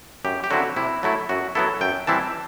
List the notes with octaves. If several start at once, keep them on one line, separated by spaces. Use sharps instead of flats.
F#2 G4
G4
D3 F#3 C4 E4 F#4
C3 E4
F#3 A3 E4
F#2 F#4
F#3 B3 E4 A4
F#2 G5
E3 G3 C4 E4 A5